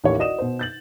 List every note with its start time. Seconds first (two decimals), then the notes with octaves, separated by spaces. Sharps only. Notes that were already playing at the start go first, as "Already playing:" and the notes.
0.04 A1 D#2 G4 C#5 E5
0.18 F#4 D5 D#5 D#6 E7
0.38 B2 C5
0.59 G6 A6 F#7